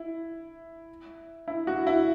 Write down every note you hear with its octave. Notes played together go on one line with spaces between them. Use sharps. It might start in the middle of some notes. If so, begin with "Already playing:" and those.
Already playing: E4
E4
F#4
E4